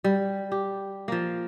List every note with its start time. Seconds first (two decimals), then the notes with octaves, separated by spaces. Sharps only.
0.04 G3
0.52 G4
1.08 F3 A#3